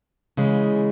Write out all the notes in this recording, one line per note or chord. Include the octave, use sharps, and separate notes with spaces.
C#3 E3 G#3